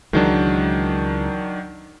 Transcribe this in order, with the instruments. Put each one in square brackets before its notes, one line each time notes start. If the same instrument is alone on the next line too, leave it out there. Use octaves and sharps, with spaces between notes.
[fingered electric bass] C#2 E3 G#3 [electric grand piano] D#3 F#3 D4